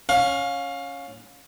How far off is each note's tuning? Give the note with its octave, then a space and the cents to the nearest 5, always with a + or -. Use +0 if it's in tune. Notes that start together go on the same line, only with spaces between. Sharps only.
C#4 +0 F5 +25